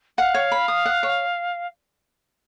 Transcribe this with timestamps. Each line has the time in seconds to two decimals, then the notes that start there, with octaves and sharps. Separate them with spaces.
0.18 F5 F#5
0.34 C#5
0.52 B5
0.68 D#6
0.86 F#5
1.03 C#5